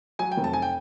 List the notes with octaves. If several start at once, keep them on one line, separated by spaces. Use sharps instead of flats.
F#3 G#5
G5
F1
A5
G#5
G5